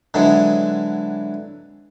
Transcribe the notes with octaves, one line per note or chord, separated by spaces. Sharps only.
D3 E3 F#3 G#3